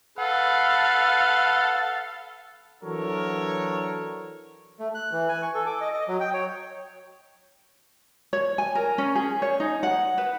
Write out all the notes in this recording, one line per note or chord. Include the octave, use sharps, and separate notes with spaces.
A4 B4 F5 F#5
E3 F#3 D4 A4 A#4 C#5
A3
F#6
E3
G#5
C#6
A4
D6
D#5
D#5
F#3
G5
C#5
C#5
G#5
A#4
C#4
G#4
C#5
D#4
F#5
B4